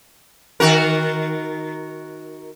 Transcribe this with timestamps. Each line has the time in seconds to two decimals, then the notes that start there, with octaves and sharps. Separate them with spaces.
0.60 D#3 F#4 A#4